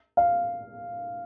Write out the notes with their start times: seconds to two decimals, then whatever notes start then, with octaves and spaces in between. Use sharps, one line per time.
0.17 F5